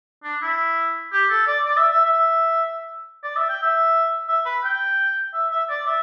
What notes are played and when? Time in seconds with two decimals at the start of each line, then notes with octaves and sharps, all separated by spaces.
0.24 D4
0.42 E4
1.13 G4
1.30 A4
1.47 D5
1.66 D5
1.78 E5
1.92 E5
2.05 E5
3.24 D5
3.36 E5
3.49 G5
3.63 E5
4.28 E5
4.46 B4
4.64 G5
5.34 E5
5.51 E5
5.69 D5
5.87 E5